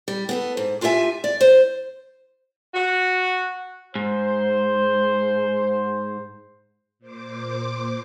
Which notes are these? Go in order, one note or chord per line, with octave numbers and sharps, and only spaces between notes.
G3
B3 G#4 A4
G#2
D4 F4 G4 C5 E5 G#5
D5
C5
F#4
G#2 C5
A#2 C5 D6